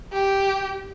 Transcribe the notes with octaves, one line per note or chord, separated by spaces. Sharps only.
G4